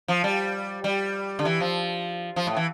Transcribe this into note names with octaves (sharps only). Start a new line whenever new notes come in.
F3
G3
G3
D3
E3
F3
F3
A2
E3